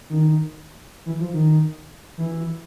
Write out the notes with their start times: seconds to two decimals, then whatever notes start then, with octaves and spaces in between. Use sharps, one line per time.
0.10 D#3
1.06 E3
1.20 F3
1.34 D#3
2.18 E3